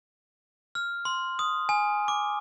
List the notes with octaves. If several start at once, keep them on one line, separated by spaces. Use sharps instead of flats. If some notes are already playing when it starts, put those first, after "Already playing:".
F6
C6
D#6
G#5
D6